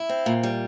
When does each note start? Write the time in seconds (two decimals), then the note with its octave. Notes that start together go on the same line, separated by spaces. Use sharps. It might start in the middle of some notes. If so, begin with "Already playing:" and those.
Already playing: E4
0.09 C4
0.26 A#2
0.43 G3